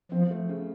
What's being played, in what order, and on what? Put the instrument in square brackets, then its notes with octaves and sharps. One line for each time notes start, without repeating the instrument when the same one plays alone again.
[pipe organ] F3 [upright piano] C4
[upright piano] A3
C#3